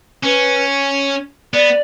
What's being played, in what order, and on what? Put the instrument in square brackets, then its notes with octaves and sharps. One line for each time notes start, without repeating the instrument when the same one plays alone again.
[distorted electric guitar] C#4 [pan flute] B4
[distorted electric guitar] B3 [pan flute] D5